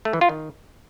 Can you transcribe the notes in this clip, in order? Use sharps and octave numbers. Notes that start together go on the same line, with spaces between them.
A3
E3
F4
D#3